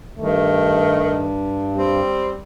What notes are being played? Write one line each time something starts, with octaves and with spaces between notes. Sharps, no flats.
G2 D#3 A3
G3 C4